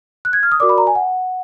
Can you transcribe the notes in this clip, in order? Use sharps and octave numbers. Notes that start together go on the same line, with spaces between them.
F#6
G#6
F6
D#6
F#4 A#4 D5 D6
B5
A#5
G#5
F#5